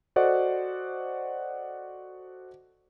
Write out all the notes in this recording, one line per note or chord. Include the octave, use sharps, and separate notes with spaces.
F#4 A4 C5 D5 D#5 F#5